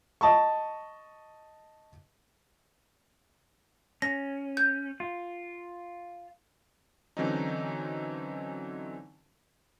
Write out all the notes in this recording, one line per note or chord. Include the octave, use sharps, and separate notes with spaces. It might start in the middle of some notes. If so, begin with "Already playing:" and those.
D#5 A5 B5 C#6
C#4 A#6
G6
F4
D3 E3 F#3 C4 C#4 D#4